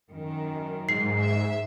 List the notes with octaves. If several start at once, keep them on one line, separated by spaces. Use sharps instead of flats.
F#2 D#3
G#2 C7
E5